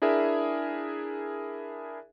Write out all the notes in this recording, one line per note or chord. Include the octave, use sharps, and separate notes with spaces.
D4 E4 G#4 A#4 E5